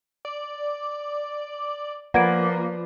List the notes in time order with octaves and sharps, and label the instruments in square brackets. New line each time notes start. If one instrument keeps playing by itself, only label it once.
[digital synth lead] D5
[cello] F3 [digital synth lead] A#3 [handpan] F4 B4 D5 [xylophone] F#5 G#6 D7